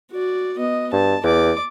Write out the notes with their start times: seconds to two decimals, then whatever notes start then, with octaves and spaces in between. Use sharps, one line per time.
0.12 F#4 D5
0.59 B3 D#5
0.93 G2 A5
1.23 E2 D5 D6